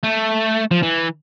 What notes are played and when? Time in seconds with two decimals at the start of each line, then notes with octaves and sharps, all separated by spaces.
0.04 A3
0.71 F3
0.83 E3